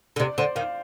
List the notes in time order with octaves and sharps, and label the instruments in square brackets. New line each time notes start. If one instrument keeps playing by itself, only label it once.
[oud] D3
[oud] C3 [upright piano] D5
[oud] D3 [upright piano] C5
[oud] D#3 [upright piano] F5